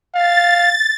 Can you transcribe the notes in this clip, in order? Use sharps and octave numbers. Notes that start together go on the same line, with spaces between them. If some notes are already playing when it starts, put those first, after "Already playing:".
F5 A6